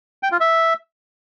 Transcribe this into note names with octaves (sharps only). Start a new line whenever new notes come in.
G5
F4
E5